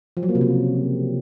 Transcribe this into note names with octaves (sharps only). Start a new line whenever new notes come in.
F3
F#3
A#3
C3
C#3